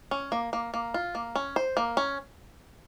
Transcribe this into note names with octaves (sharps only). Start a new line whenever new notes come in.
C#4
A#3
A#3
A#3
F4
A#3
C#4
C5
A#3
C#4